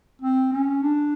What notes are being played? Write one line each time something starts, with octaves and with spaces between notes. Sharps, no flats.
C4
C#4
D4